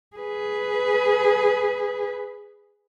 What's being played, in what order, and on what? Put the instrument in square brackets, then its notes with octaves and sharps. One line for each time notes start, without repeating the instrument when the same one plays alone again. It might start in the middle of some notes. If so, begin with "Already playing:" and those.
[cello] G#4 B4